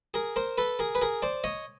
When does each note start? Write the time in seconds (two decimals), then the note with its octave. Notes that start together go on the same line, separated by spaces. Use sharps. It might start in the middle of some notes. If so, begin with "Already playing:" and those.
0.14 G#4 A#4
0.36 A#4 C5
0.58 A4 B4
0.79 G#4 A#4
0.95 B4
1.02 G#4 A#4
1.22 C5 D5
1.44 C#5 D#5